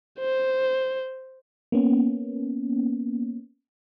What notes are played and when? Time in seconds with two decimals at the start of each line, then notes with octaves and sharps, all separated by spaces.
0.20 C5
1.72 A#3 B3 C#4